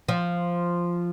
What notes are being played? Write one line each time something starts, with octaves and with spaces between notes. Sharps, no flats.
F3